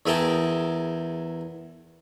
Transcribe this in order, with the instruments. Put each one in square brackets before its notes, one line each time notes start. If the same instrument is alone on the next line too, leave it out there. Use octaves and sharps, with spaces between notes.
[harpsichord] E2 E4 G#4 A#4 G5 A5